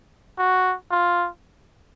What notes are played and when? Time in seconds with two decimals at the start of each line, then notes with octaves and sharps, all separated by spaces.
0.38 F#4
0.91 F4